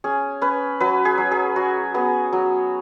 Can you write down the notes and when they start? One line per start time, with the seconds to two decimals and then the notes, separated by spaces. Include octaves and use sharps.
0.04 C#4 G#4
0.42 C#4 B4
0.80 F#3 B4
1.05 G#4
1.17 F#3
1.31 G#4
1.56 F#3 F#4
1.94 B3 G#4
2.33 F#3